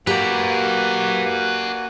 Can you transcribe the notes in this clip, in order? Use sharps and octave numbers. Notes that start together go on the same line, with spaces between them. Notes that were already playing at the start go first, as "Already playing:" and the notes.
A#3 F#4 G4 B4 D5 G#5 A#5